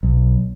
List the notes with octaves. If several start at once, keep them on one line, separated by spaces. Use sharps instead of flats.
B1